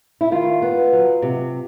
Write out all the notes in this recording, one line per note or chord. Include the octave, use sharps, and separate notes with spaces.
E4
D#3 F4
B3
F#3
C3